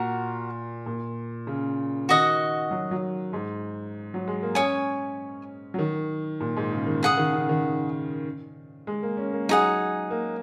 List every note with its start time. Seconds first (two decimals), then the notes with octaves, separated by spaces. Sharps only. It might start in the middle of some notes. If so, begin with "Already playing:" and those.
Already playing: A#2 F#4 A#4 F#5
0.86 A#2
1.47 C#3
2.09 D#3 F#4 D#5 F#5
2.71 F#3
2.91 F#3
3.33 G#2
4.14 F#3
4.28 G#3
4.42 A#3
4.55 C#4 C#5 G#5 D#6
5.74 F#3
5.79 D#3
6.40 A#2
6.57 G#2
6.72 C#3
6.87 D#3
7.02 C#3 G#4 F#5 D#6
7.17 D#3
7.34 C#3
7.49 D#3
8.87 G#3
9.03 A#3
9.17 C#4
9.33 A#3
9.49 F#3 D#4 G#4 F#5
10.10 A#3